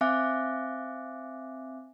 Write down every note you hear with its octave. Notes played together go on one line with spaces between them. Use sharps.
C4 E5 F5 G#5 D6 F#6